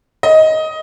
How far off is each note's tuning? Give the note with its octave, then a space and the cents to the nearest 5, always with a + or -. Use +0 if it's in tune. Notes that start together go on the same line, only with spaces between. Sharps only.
D#5 +15